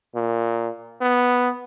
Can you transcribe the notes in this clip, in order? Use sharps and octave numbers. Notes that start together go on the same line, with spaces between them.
A#2
B3